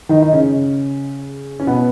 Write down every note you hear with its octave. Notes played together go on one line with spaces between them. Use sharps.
D#3 D#4
D#4
C#3 C#4
C#4
B2 B3